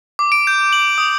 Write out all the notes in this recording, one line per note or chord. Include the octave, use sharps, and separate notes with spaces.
D6
D7
G6
F#7
D#6